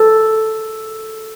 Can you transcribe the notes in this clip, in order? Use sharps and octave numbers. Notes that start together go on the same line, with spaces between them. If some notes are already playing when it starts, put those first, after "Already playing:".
Already playing: A4